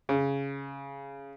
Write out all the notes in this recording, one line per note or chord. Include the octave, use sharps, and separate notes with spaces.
C#3